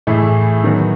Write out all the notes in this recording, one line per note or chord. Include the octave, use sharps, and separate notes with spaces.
A2 E3 A3 E4 G#4
D#3 F#3 B3 F#4